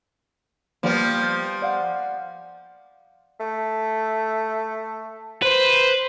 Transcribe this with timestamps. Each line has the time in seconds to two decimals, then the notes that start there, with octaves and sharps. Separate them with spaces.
0.83 F3 G3 A#3 B3
1.23 G6 A6
1.62 D5 F5 F#5
3.40 A3
5.42 B4 C5